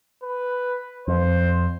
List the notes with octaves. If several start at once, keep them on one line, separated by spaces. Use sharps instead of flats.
B4
F2 C5